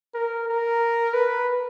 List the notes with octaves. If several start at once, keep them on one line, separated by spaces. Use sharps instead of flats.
A#4
A#4
B4